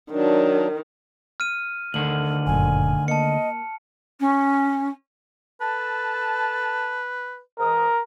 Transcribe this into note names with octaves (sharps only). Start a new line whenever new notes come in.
D#3 F#3 D4
F6 D#7
D2 D3 D#3 F#7
G1 F#2 A#2 G#5
A#3 D#5 A5 C#7
C#4
A4 B4 A5
G#2 E3 A#4 D#6